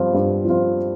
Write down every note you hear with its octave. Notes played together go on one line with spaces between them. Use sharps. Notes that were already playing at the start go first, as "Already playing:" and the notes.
Already playing: G2 F3 C4 F4
G2
F3 C4 F4